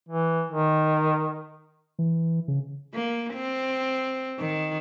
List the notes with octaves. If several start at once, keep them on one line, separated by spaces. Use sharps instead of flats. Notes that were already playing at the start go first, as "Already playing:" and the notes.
E3
D#3
E3
C#3
A#3
C4
D#3